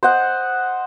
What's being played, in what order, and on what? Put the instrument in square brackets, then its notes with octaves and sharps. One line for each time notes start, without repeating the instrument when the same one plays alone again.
[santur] C5 D#5 F#5